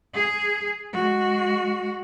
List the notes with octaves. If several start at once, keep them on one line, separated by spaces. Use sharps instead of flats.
G#4
G#3 F#4